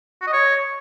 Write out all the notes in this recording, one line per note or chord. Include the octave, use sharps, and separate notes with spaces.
F#4
D#5
C#5